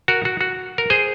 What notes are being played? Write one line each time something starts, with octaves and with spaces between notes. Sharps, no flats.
F#4 A#4
F#4
F#4
A#4
G#4 C5